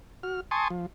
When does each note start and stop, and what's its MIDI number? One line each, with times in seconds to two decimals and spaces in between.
0.23 0.40 66
0.23 0.40 89
0.51 0.68 80
0.51 0.68 81
0.51 0.68 84
0.51 0.68 85
0.51 0.68 87
0.70 0.86 53